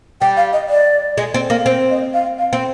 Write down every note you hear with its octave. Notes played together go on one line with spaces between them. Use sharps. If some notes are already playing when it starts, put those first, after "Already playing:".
G3 G5
F5
D#5
D5
G#3
C4
A#3
C4 C5
D#5
F5
F5
C4